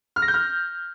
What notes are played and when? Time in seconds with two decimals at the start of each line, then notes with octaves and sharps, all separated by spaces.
0.16 F6
0.22 A#6
0.28 G6
0.34 F6